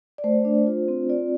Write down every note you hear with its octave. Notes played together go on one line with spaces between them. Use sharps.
D5
A3 C5
D4
F4
C4
F4 D5